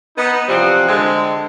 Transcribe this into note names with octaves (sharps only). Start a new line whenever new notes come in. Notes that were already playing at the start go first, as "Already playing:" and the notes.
B3 D#4
C3 E3 F3 G3 C4 F#5
D3 G#3 C4